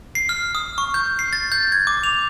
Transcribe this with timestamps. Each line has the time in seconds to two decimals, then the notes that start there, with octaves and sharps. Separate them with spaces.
0.15 C7
0.29 F6
0.55 D#6
0.78 C#6
0.94 G6
1.19 C7
1.33 A6
1.52 G6
1.72 G#6
1.87 D6
2.04 F7